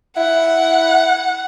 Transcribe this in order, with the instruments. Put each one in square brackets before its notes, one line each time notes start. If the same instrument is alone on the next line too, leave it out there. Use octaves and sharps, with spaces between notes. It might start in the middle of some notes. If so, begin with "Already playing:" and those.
[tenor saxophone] E4 [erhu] F#5